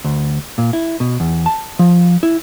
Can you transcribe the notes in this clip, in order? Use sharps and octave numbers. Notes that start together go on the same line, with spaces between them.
D2
A#2
E4
B2
E2
A5
F3
E4